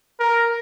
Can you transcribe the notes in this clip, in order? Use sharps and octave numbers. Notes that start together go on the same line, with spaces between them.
A#4